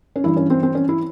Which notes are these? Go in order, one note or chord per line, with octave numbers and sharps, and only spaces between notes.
C#4
G2 E3 E4
C#4
C4
C4
C#4
E4